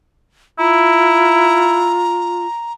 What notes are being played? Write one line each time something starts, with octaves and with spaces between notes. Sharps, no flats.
E4 F4 A#5